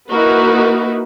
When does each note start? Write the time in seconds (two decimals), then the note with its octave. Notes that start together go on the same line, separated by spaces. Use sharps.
0.10 A#3 D#4 E4 F#4 A#4 B4